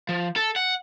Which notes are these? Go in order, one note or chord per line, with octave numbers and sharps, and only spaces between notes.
F3
A4
F#5